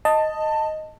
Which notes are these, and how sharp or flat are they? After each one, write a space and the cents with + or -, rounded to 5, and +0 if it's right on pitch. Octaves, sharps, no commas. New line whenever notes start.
D#5 +0 A5 +15